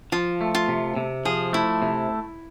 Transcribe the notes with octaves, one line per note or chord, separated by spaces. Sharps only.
F3 F4
A3
F4
C3
C3
F3 G#4
A3 E4
C3